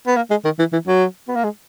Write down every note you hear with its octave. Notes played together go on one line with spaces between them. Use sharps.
B3
A#3
G#3
D#3
E3
E3
F#3
B3
A#3
G#3